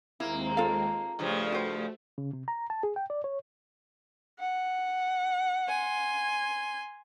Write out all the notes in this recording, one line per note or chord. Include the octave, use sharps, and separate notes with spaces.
D#2 G#3 A#3 C4 E4
F4 A4 F5
G2 C#3 F3 A3
F#4 C5
C#3
C3
A#5
A5
G#4
G5
D5
C#5
F#5
G#5 C6